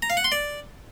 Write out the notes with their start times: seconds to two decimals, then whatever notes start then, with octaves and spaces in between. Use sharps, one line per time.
0.02 A#5
0.10 F5
0.17 F#5
0.24 C6
0.32 D5